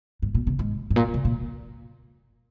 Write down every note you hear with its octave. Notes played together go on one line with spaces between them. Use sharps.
G#2
A#2
C3
G#2
G#2
A#2
C3
A#2